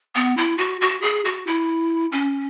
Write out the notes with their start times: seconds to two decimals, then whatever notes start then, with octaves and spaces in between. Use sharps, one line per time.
0.15 B3
0.37 E4
0.58 F#4
0.81 F#4
1.02 G#4
1.25 F#4
1.47 E4
2.12 C#4